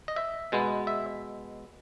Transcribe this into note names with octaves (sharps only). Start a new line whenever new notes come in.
D#5
E5
B2 G#3 B3
E5